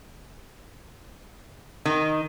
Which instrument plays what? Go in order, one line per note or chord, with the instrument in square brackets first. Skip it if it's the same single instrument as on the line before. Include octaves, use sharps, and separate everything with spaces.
[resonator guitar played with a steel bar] D#3